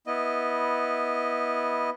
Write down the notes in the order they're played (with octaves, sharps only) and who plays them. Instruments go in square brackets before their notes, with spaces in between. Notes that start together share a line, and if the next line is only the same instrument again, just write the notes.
[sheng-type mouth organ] B3 E4 D#5